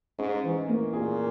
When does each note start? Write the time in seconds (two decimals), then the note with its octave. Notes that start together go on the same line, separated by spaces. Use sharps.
0.19 G#2 C#4
0.44 E3
0.69 A#3
0.93 A#2 G#4